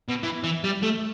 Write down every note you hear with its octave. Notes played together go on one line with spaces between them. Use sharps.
B2
E3
E3
G3
A3